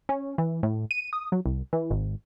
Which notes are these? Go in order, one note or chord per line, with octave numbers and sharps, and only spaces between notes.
C#4
E3
A2
D#7
D#6
F#3
C2
E3
G#1